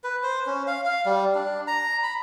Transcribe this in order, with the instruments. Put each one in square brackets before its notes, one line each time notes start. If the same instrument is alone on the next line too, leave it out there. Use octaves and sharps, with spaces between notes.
[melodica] B4
C5
C#4
F5
F5
G3
D4
A#5
B5